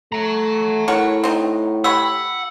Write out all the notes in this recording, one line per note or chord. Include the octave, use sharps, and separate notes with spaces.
A3 F#5 A#5
A2 F#4 A#4 C#5
C4 D#4
G4 C#5 F#5 B5 E6